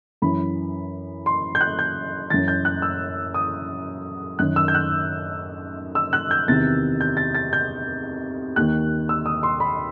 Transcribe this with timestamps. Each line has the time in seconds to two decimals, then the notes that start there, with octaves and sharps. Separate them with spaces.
0.22 F#2 E3 B5
1.26 C6
1.55 G6
1.61 F#6
1.79 G6
2.30 F#2 E3 A6
2.48 G6
2.65 F#6
2.82 E6
3.34 D#6
4.39 F#2 D#3 F#6
4.56 E6
4.68 G6
4.75 F#6
5.95 E6
6.13 F#6
6.31 G6
6.48 E2 C3 D#3 A6
7.01 G6
7.17 A6
7.34 A6
7.53 G6
8.56 D#2 D#3 F#6
9.09 E6
9.26 D#6
9.43 C6
9.60 B5